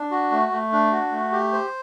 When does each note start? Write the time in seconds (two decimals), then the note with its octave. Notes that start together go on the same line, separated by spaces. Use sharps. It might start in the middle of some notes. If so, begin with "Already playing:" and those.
Already playing: D4
0.11 F#4
0.31 A3
0.52 A3
0.72 D4
0.92 F#4
1.11 A3
1.32 G4
1.52 C5